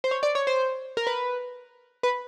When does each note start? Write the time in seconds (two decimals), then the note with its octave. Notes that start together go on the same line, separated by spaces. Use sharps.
0.04 C5
0.11 C#5
0.23 D5
0.35 C#5
0.47 C5
0.97 A#4
1.07 B4
2.03 B4